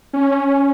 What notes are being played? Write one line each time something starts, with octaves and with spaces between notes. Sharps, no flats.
C#4